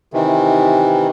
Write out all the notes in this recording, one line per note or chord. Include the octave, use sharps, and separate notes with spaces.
C3 D#3 E3